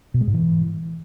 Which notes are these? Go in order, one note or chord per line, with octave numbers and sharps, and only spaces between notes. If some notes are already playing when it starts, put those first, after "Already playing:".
B2
G#3
G#2
E3